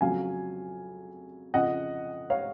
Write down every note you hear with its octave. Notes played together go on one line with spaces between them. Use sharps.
F2 C#3 F#3 F5 G#5
F2 C#3 F3 D#5 F#5
C#5 F5